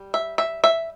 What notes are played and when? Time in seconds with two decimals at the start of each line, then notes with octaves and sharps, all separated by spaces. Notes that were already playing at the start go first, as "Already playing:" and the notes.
Already playing: G3
0.14 E5
0.38 E5
0.64 E5